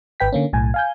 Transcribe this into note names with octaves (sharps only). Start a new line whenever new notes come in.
G#1 B4 G5 B6
D3 A#3 C#4
B1 A2 G#5
F5 G#5 G6